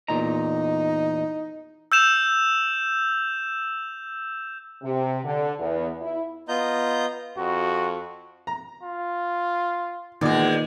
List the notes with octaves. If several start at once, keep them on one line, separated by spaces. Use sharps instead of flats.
E2 A#2 D#4 A#5
E6 G6 E7 F7
C3
D3
E2
E4
B3 F4 D#5 A#5 G6
F2 F#4
A#5
F4
E2 A#2 D#3 G#3 D5 D6